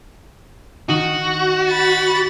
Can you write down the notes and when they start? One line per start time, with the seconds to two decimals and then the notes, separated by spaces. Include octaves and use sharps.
0.89 D#3 D#4 F#4 D#7
1.70 B5 A6